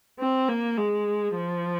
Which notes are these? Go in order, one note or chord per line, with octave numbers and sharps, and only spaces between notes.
C4
A#3
G#3
F3